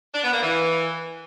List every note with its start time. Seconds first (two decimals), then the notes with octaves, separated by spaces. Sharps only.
0.15 D4
0.24 B3
0.33 A#3
0.43 E3